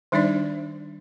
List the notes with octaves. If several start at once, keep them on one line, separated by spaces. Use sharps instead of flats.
D#3 G3 D4 D#4 C5 D5